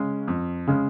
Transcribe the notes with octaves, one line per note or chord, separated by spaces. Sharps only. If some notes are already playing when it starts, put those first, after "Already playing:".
Already playing: C#3 G#3 C#4
F2
C#3 G#3 C#4